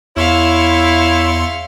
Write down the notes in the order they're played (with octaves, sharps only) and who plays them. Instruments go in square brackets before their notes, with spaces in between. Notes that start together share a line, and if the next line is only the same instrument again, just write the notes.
[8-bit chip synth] E2 C6 C#7 [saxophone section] E4 [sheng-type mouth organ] C#5 [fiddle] E5 F5